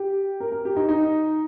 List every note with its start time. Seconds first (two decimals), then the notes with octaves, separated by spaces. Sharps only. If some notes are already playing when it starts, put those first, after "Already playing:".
Already playing: G4
0.40 A#4
0.52 A#4
0.65 G4
0.76 D#4
0.89 D#4